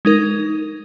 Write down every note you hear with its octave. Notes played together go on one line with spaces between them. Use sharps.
G#3 D#4 A#4